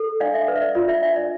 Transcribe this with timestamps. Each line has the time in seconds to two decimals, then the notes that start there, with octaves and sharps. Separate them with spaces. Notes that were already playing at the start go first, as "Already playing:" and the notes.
Already playing: A4
0.20 D4 D5 F5
0.34 E5
0.48 B4 D5
0.55 E5
0.62 D5
0.75 F4 D5
0.88 E5
1.02 D4 E5
1.16 D5